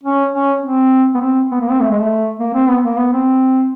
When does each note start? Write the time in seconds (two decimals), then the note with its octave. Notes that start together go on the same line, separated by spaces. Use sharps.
0.03 C#4
0.32 C#4
0.62 C4
1.15 B3
1.20 C4
1.51 B3
1.60 A#3
1.70 C4
1.80 A3
1.91 G#3
2.00 A3
2.40 A#3
2.55 C4
2.68 B3
2.84 A#3
2.98 B3
3.13 C4